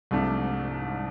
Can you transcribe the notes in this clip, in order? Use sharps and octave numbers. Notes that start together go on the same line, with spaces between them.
C2 G#2 C3 F3 A3 D4